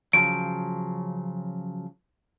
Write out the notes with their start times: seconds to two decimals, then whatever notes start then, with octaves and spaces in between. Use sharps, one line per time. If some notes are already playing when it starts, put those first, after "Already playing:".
0.13 C#3 F3 F#3 D7